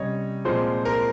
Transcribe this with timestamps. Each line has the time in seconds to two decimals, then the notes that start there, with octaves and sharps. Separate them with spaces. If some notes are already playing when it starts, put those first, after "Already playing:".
Already playing: C3 G3 C#4 C#5 D#5
0.45 A#2 F3 G#3 C4 C5
0.85 A#4